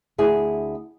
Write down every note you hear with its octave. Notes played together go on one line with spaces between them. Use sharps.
D2 E4 G#4